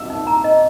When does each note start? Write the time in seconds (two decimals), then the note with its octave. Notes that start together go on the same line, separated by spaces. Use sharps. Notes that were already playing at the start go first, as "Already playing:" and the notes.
Already playing: E6
0.10 D#4
0.27 A#5
0.44 D#5